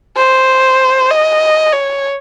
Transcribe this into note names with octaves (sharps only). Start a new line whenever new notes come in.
C5
D#5
C#5